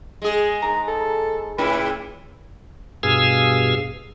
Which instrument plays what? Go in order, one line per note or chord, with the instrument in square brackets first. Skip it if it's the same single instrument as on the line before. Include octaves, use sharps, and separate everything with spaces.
[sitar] G#3 G#4
[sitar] G#2 [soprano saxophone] A#5
[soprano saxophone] A4
[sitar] A2 C#3 E4 [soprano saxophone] B4
[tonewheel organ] G2 B2 G#4 F5 G#5 E6